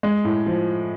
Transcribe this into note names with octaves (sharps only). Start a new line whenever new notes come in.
G#3
A2
F3